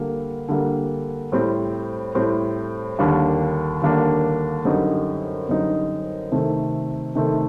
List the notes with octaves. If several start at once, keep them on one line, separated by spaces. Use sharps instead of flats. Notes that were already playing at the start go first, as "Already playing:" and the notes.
Already playing: D3 G3 A#3
D3 G3 A#3
A2 G3 C4
A2 G3 C4
D#2 D3 G3 A#3 D4
D#2 D3 G3 A#3 D4
F#2 D3 G3 C4 D#4
F#2 D3 G3 C4 D#4
C3 D#3 A3 C4
C3 D#3 A3 C4